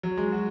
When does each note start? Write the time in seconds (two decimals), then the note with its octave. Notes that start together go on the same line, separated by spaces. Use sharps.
0.03 F#3
0.17 G#3
0.32 F#4